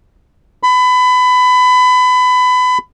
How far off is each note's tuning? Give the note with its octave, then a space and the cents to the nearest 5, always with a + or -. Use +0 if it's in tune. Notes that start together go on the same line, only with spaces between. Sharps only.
B5 +25